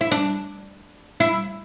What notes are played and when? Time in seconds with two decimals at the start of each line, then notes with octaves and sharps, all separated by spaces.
0.01 E4
0.11 D4
1.20 E4